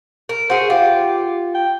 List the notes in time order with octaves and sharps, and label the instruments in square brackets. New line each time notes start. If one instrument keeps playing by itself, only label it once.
[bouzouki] A#4
[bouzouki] F#4 G#4 [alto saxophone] C5
[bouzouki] F4 [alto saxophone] G4
[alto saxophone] G5